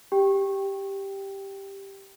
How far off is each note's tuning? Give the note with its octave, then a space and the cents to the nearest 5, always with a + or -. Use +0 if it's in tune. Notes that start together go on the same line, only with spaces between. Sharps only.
G4 +0 G5 +0